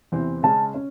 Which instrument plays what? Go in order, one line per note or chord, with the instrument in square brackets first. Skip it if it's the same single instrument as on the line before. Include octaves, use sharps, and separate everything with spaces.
[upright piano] E2 C3 E3 C4
[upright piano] C#3 G#3 C#4 [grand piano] A5
[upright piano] C#4